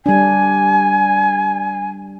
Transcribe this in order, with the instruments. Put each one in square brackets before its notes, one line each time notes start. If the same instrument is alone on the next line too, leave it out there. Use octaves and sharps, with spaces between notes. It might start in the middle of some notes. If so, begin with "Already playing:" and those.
[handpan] G3 D4 [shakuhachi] G#5